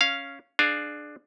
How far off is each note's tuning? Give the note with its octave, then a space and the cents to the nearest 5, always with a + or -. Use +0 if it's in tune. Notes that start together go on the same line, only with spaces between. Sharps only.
C#4 +0 F5 -5
D4 +15 G#4 +30 F5 +0